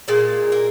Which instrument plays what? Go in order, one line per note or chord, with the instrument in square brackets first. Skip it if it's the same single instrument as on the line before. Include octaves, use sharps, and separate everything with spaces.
[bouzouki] A#2 G#3 A#3
A#3